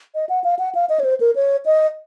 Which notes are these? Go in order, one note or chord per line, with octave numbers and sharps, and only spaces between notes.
D#5
F#5
F5
F#5
F5
D#5
C#5
C5
A#4
C#5
D#5